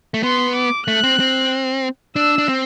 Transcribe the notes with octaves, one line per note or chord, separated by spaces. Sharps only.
A3
B3 C6
D6
A3 F#6
C4
C4
D4 E6
D4
C4